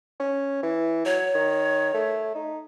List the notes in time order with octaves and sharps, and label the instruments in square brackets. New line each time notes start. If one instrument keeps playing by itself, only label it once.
[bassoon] C#4
E3
[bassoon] F#3 [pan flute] C#5
[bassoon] D#3
A3
D#4